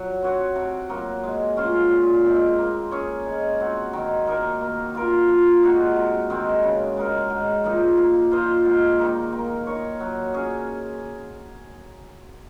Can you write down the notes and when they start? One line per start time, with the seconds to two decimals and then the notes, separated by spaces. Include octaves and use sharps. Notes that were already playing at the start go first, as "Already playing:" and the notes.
Already playing: F#3
0.23 C4 F#4 C#5
0.56 C3
0.89 F#3 A#3
1.23 G#3
1.57 C#4 F4 C5
1.91 A#2
2.25 G#3 C4
2.58 A#3
2.91 C#4 G#4 C#5
3.26 G#3
3.60 C4 F#4
3.93 D#3
4.27 A#3 D#4 A#4
4.61 A#3
4.95 F4 A#4
5.28 F3
5.62 G#3 D#4 F#4
5.96 C3
6.30 D#3 G#3 C4
6.63 C#3
6.97 G#3 D#4 A#4
7.30 G#2
7.64 F3 A#3 D#4
7.98 A#3
8.32 F4 C5 D#5
8.65 G#2
8.99 D#3 A#3 D#4
9.33 A#3
9.67 D#4 A#4 C#5
10.00 F#3
10.34 C#4 G#4